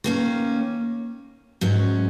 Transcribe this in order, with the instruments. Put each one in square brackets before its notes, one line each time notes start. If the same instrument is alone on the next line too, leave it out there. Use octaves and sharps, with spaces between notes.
[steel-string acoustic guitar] D#3 A#3 C#4
G#2 F#3 C#4